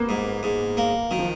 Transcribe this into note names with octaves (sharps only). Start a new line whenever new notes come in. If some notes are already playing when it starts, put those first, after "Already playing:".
Already playing: A#3 B3
G#2
G#2
A#3
D#3 F#3
F3